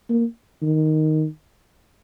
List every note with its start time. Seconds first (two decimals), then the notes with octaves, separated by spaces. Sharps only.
0.10 A#3
0.62 D#3